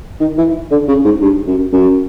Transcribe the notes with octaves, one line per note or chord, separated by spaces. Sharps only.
D#3
E3
D3
C#3
G#2
G2
F#2
F#2